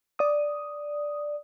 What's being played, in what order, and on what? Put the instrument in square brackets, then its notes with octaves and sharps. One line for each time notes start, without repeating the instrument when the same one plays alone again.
[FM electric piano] D5 D#6